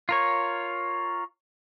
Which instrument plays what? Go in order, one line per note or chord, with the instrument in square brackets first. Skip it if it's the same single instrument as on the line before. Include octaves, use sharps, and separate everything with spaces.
[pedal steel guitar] F4 A#4 C#5